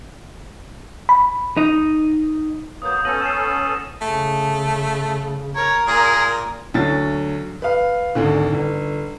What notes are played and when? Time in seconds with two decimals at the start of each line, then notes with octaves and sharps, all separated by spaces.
1.09 B5
1.57 D#4
2.82 F#3 A#3 B3 D#6 G6
3.05 B3 C#4 A4 A#6 D#7 F#7
3.22 C7 D#7 E7
4.02 C#3 A3
5.56 A#4 C#5
5.87 A#2 G#4
6.74 D2 F#3 A6
7.62 B4 F5
8.15 G#1 D2 D3
8.52 G1